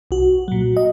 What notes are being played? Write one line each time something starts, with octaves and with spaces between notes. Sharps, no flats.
C2 F#4
A#2 F#3
D#5